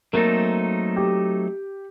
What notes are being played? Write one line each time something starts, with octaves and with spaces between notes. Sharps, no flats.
F#3 A3 A#3 C4 D#4 A4 A#4
G4